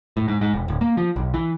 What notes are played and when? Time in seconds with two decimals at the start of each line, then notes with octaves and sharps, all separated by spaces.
0.17 A2
0.28 G#2
0.41 G#2
0.54 E1
0.68 D1
0.81 A#3
0.97 F3
1.16 B1
1.34 E3